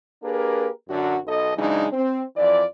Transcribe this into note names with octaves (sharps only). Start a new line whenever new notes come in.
A#3 D4 G4 G#4 A#4 B4
F#2 D3 F#4
B1 A4 D#5
C#3 E3 F#3 G#3 D4 D#4
C4
F2 E3 F4 D5